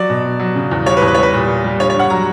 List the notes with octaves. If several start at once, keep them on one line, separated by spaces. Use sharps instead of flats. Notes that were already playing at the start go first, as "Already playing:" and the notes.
Already playing: F#3 D5
B2
B2
F#3
C#3
E2
G3 C#5
B4
E2
B4
C#5
G3 B4
A#2
A#2
G3
D3 C#5
C#5
G2
F#5
F#3 A#5